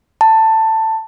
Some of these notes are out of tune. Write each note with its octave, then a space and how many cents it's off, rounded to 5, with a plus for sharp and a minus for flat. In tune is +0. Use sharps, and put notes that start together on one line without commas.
A5 +15